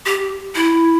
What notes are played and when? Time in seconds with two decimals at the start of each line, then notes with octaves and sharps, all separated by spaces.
0.06 G4
0.55 E4